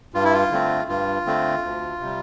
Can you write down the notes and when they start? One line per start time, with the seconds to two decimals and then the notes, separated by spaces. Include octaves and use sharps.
0.14 G2 F4
0.24 E4
0.33 F4
0.51 D3 A3 C4
0.89 G2 F4
1.26 D3 A3 C4
1.64 D2
2.00 C3 G3